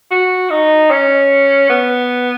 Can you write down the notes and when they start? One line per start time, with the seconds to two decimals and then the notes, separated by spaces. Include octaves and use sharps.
0.11 F#4
0.50 D#4
0.91 C#4
1.69 B3